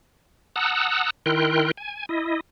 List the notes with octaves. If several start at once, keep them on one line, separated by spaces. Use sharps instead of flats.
F#5 A5 A#5 D#6 E6 F#6
D#3 E4 A#4 G5 C6 F#6
G#5
E4 D#5